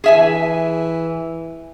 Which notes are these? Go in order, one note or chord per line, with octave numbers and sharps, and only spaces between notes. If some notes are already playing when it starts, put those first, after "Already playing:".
E3 G#4 E5 G#5